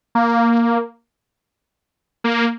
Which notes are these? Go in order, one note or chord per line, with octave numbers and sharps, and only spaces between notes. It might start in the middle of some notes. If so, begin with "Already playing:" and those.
A#3
A#3